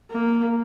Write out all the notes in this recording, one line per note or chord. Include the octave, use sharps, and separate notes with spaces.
A#3